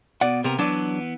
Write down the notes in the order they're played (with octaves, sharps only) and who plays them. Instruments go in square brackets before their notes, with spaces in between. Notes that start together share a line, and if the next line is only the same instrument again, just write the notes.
[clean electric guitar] B2 [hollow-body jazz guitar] D5 F#5
[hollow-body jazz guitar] C3 [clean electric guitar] A#3 B3 A#4
[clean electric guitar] E3 B3 [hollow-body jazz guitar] F#3 D4